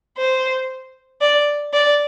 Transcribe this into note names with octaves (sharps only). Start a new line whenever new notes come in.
C5
D5
D5